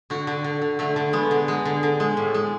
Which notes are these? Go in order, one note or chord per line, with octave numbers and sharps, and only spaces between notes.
D3 F#4
D3
D3
D3
D3 A3
D3
G#3 B3
D3
G#3
D3
D3
G#3
A2
G#3